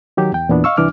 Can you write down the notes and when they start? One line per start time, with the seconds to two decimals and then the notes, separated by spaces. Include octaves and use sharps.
0.17 D#3 F#3 G4
0.32 E2 G5
0.49 E2 A#2 B3 D4
0.64 D#5 F5 C#6 E6
0.77 C2 E3 D4 D6 F6